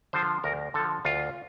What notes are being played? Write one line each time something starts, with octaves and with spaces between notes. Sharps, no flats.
D3 F3 C5
D2 A#4
D3 F3 A4
D2 F4